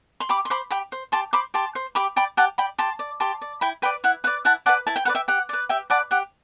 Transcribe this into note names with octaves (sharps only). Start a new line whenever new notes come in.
C6
G4 B5 D6
C6
C5 B5 D6
G4 G5 B5
C5
G4 A5 C6
C5 B5 D6
G4 A5 C6
C5
G4 B5 D6
D5 G5 B5
G4 F#5 A5
D5 G5 B5
G4 A5 C6
D5
G4 A5 C6
D5
E4 G5 B5
B4 D5 G5 B5
E4 F#5
B4 D5 F#5
E4 F#5 A5
B4 D5 F#5 A5
E4 A5
G5
B4 D5 F#5
E5 G5
G4 F#5
B4 D5
G4 E5 G5
B4 D5 F#5 A5
G4 F#5